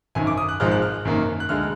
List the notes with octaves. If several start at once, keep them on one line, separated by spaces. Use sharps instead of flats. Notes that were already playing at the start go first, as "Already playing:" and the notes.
G#1 F#2 D#3 G#5
D6
D#6
F#6
G#1 G#2 F3 G#3 F6
F#6
F6
G#1 F#2 D#3 A#3
F#6
D2 D3 G#3 F6